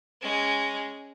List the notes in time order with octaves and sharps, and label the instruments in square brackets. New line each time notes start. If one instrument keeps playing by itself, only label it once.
[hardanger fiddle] G#3 C#4